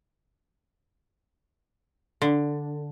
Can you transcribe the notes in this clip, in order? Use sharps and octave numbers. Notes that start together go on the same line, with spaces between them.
D3